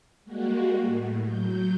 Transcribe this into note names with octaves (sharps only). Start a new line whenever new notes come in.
G3 G#3 A#3 F#4
A2
F#3 G6